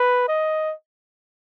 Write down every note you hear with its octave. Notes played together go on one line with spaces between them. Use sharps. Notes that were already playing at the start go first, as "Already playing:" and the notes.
Already playing: B4
D#5